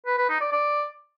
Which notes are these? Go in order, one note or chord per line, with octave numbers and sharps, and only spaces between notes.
B4
B4
D#4
D5
D5